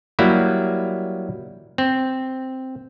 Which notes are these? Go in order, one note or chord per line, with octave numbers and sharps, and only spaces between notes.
F#3 G3 A#3 E4
C4